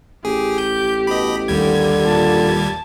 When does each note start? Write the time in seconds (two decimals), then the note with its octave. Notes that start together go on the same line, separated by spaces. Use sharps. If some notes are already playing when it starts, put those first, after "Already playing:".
0.25 A1 G4 G#4
0.58 G6
1.07 B2 D#5 B5
1.48 D#2 D3 G3 G#6
2.06 A#2 A5